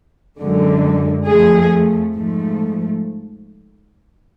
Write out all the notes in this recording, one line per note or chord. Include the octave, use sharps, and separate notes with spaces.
F#2 D3 G#3
F2 F3 A3 G#4
G#2 F3 A3